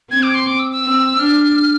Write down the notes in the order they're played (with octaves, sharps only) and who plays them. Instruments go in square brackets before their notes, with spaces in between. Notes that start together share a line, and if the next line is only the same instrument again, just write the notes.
[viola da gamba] C4 [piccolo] G#6
[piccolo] D6
C6
D6
E6
E6
[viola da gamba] C4
[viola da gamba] D4 [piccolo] F6